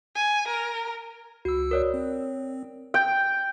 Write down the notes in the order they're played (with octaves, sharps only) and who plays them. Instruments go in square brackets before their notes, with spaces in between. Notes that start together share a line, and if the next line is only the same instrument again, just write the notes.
[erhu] G#5
A#4
[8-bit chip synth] C#2 E6 [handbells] F#4
[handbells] A#4 C#5 D5
[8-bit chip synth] C4
[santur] G5